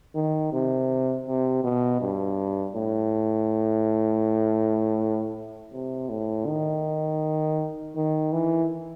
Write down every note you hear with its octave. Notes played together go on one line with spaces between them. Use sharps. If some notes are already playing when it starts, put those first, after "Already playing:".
D#3
C3
C3
B2
G2
A2
C3
A2
D#3
D#3
E3